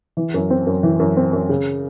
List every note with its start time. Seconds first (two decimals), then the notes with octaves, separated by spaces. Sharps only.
0.17 E3
0.34 F#2
0.50 C4
0.67 F#2
0.83 E3
1.00 F#2
1.17 C4
1.33 F#2
1.49 C#3